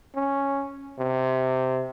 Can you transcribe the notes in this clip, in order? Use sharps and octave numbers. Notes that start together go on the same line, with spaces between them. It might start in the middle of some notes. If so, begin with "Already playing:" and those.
C#4
C3